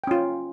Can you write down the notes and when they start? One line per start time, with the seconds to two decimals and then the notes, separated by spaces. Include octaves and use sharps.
0.04 G5
0.07 C#4
0.11 F4